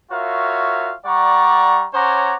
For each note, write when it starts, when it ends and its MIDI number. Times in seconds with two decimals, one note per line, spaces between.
0.11 0.94 65
0.11 0.94 66
0.11 0.94 70
0.11 0.94 73
0.11 0.94 76
0.11 0.94 77
1.05 1.86 55
1.05 1.86 74
1.05 1.86 78
1.05 1.86 82
1.05 1.86 85
1.94 2.36 61
1.94 2.36 72
1.94 2.36 73
1.94 2.36 78
1.94 2.36 82
1.94 2.36 86